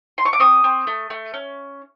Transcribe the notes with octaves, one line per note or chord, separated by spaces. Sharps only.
C6
C#6
D6
C4 C#6 D#6
C4
A3
A3
C#4